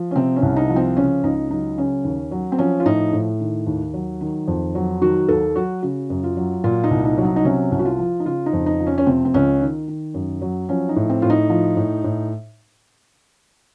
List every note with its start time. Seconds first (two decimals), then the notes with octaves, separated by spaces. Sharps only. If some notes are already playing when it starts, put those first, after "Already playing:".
Already playing: F3
0.11 C#4
0.16 C3 C4
0.36 C#4
0.42 C2
0.56 D#4
0.69 F3
0.76 C4
0.97 C#3 C#4
1.23 C#2 D#4
1.51 F#3 D#4
1.77 C#3 C#4
2.04 D#2
2.31 F#3
2.52 C4
2.59 F3 C#4
2.80 F4
2.85 A2 D#4
3.13 A2
3.40 D#3
3.67 D#2
3.94 F#3
4.21 D#3
4.48 F2
4.75 F#3
5.02 D#3 F#4
5.29 D#2 A4
5.55 F#3 F#4
5.82 C#3 F#4
6.10 F#2
6.23 F4
6.37 F#3
6.64 A#2 F4
6.84 D#4
6.91 C2
7.05 D#4
7.18 F#3
7.25 D#4
7.36 D#4
7.45 C3 C#4
7.72 C2
7.79 F#4
7.85 F4
7.99 F3
8.20 D#4
8.26 C#3 F4
8.46 D#4
8.53 F2
8.66 D#4
8.80 F3
8.87 C#4
8.98 C#4
9.07 C3 C4
9.25 C4
9.34 C#2 C#4
9.61 D#3
9.88 D#3
10.14 F#2
10.42 F#3
10.69 F3 C#4
10.89 D#4
10.96 A2
11.09 C4
11.22 A2 F4
11.30 D#4
11.50 F3
11.77 A2
12.04 A2